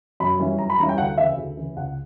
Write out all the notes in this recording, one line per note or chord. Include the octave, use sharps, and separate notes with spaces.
F#2 B5
E3 G3 C#4 E4
F#2 A#5
B5
E3 G3 C#4 E4 A#5
G5
D2 F#5
C#3 E3 E5
D2
C#3 E3
C#2 F#5